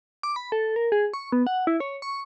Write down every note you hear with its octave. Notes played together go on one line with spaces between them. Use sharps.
D6
B5
A4
A#4
G#4
C#6
B3
F#5
E4
C#5
C#6